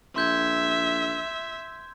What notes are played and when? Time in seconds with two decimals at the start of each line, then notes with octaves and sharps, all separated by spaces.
0.16 A#1 E5 C6 G6 G#6